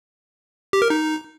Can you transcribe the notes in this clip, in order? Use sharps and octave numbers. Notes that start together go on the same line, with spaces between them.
G4
A#4
D#4